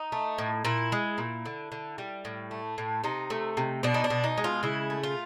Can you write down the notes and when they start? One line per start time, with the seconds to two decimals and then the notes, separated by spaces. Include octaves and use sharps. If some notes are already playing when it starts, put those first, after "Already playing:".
Already playing: D#4
0.12 A3
0.38 A2
0.65 A#2 E4
0.92 G#3
1.18 A#2
1.45 D3
1.72 D3
1.98 G3
2.25 A2
2.51 A3
2.78 A2
3.04 C3 D#4
3.30 A3
3.57 C3
3.83 B2 D4
3.94 D#4
4.04 D4
4.10 B2
4.24 D#4
4.37 G#3
4.44 F4
4.63 C#3 E4
4.90 A3
5.03 F4